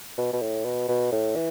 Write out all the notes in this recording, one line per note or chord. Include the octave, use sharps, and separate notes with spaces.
B2
B2
A2
B2
B2
A2
E3